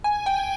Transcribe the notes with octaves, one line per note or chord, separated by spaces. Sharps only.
G#5
G5